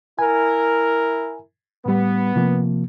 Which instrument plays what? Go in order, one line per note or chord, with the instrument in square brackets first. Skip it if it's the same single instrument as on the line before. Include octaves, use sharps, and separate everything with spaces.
[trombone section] E4 A#4 [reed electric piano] G#5
[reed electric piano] A2 G3 [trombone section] B3
[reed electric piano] C3 F3 A#3